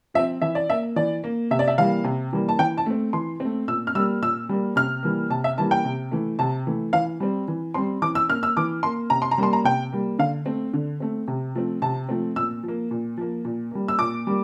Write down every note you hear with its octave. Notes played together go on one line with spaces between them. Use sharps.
F3 C4 E5
E3 E5
D5
A#3 E5
E3 D5
A#3
C3 E5
D5
E5
E3 G3 A#3 F5
C3
E3 G3 A#3
A5
E3 G5
A5
A3 C4
E3 C6
A3 C4
A#2 E6
F6
G3 A#3 E6
A#2 E6
G3 A#3
C3 F6
E3 G3 A#3
C3 A5
E5
E3 G3 A#3 A5
G5
C3
E3 A3
C3 A5
E3 A3
E3 F5
G3 C4
E3
G3 C4 C6
E3 D6
E6
A#3 F6
E6
E3 D6
A#3 C6
C3 A#5
C6
A#5
G3 A#3 C6
A#5
C3 G5
G3 A#3
D3 F5
A3 C4
D3
A3 C4
C3
F3 A3 C4
C3 A5
F3 A3 C4
A#2 E6
F3 A#3
A#2
F3 A#3
A#2
G3 A#3
E6
A#2 D6
G3 A#3